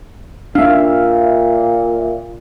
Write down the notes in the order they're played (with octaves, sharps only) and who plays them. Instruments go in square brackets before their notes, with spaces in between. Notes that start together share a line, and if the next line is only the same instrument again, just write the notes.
[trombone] A#2 [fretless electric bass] D4 [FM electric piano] E5 F5